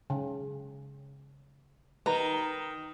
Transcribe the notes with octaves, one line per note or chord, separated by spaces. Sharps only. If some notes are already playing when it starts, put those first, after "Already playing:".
C#3
D#3 B4 A#5